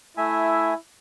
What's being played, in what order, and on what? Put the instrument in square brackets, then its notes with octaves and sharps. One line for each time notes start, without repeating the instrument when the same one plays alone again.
[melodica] A3 E5 G#5 [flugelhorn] E4